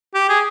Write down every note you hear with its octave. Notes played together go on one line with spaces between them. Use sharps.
G4
G#4